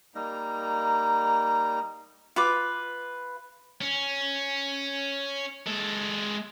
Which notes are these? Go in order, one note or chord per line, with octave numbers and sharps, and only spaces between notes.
G3 A#3 D#4 A#5
F4 B4 D6
C#4
G#3 A4